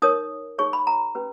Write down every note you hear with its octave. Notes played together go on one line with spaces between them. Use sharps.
D#4 A#4 C#5 D#6
D#4 G#4 C#5 C#6
B5
A#5
C#4 G4 B4